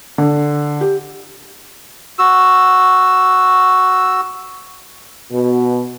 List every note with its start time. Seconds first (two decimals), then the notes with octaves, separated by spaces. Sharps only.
0.18 D3
0.81 G4
2.19 F#4 E6
5.32 B2